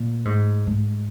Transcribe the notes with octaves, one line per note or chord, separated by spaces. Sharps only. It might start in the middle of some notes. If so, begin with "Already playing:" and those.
Already playing: A#2
G#2
G#2